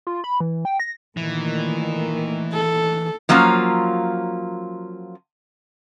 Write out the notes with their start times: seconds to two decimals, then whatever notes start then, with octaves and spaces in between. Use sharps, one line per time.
0.07 F4
0.24 B5
0.40 E3
0.65 G5
0.80 A#6
1.17 A#2 D#3 E3 A3
2.53 A4
3.29 F3 F#3 A#3 C#4 F4